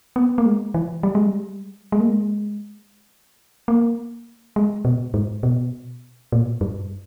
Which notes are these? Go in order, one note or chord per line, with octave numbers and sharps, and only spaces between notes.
B3
A#3
G#3
E3
G3
G#3
G3
G#3
A#3
G#3
A#3
G#3
B2
G#2
B2
A#2
G2